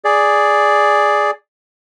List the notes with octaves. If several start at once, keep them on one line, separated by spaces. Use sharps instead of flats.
G#4 D5